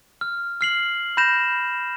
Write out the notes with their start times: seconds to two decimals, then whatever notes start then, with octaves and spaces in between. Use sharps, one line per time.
0.21 F6
0.61 F6 C7 F#7
1.17 B5 G6 A#6 E7